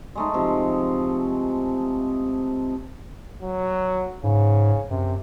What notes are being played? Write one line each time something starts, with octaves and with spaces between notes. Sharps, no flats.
G#3 A3 D#4
C3 F3
F#3
G#2 C#3
F#2 C3